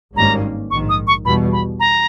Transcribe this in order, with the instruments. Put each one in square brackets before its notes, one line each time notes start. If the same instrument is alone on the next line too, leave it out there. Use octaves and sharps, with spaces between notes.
[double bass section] G#1 G2 D#3 A#3 C#4 [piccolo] A#5
[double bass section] A#1 G#2 D#3 [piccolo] C#6
[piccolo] D#6
C#6
[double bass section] E2 B2 G3 [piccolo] B5
[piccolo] B5
A#5